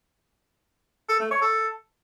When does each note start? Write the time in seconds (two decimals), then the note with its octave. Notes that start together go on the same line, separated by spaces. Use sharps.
1.09 A4
1.20 A3
1.31 C#5
1.42 A4